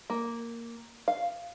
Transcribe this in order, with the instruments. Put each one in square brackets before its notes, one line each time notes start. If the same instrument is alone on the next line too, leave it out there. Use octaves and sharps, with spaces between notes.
[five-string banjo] A#3
F5